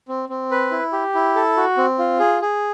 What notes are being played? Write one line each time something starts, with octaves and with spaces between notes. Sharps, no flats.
C4
C4
B4
E4
G4
E4
A4
F#4
C4
F4
G#4
G#4